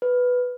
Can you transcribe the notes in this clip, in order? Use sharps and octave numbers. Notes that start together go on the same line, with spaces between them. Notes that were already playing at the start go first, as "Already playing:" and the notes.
B4